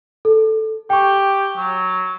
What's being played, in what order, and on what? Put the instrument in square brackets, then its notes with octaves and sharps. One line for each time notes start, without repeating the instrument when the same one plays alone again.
[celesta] A4
[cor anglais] G4 [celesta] G5 C#6
[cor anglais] F#3